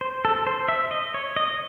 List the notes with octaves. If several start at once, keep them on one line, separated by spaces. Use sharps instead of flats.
C5
A4
C5
E5
D#5
C#5
D#5